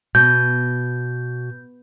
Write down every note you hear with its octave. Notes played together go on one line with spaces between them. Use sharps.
B2 G6